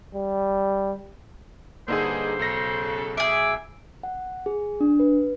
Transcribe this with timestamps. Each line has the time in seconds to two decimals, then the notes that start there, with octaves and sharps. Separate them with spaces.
0.15 G3
1.88 G2 D3 A#3 D#4 G#4 C5
2.39 B1 C#3 A4 A#6
3.17 G#4 E5 D6
4.03 F#5
4.46 G#4
4.80 D4
5.00 B4